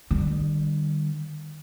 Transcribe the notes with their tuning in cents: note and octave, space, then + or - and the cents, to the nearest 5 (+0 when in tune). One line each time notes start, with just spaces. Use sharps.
D#3 -45 G3 +0